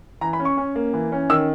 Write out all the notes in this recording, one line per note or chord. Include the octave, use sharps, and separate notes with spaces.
E3 A#5
B5
C#4
C#6
C#4
A#3
E3
C#4
D#3 E6